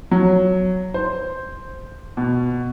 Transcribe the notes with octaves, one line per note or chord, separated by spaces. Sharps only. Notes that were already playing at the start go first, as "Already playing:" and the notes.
F#3
C5
B2